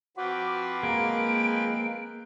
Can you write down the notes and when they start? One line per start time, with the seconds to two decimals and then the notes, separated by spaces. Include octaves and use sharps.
0.17 F3 C4 F#4 B4 D6
0.83 G#3 A#3 D7